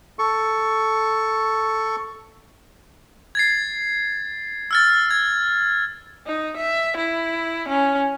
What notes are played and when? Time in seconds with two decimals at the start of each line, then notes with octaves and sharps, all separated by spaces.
0.19 A4 C#6
3.35 G#6 A6 C7
4.71 E6 F6 A6
5.11 G#6
6.26 D#4
6.57 E5
6.97 E4
7.68 C#4